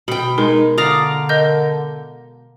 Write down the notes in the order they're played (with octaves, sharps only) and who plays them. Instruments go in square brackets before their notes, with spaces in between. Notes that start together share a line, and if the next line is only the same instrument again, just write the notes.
[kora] B2 [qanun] G5 B5
[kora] G#3 [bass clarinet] D#4 [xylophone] A#4
[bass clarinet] D3 [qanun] D5 F5 A#5 [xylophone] D#6
[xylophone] A#4 D#5 G6